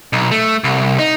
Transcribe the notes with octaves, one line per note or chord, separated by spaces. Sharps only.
B1
A3
C2
D#4